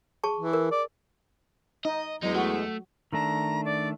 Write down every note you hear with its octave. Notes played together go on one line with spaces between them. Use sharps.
G#4 A5 C#6
E3
A#4
D5
D#4 D#5
E2 F#3 G#3 D#4
A3 F#4
D#3 A3 D4 A#5
D5